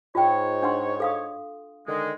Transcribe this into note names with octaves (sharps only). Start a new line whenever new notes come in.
G#2 F4 C#5 G5
D4 F#5 C6
A4 F5 D#6
D3 D#3 G#3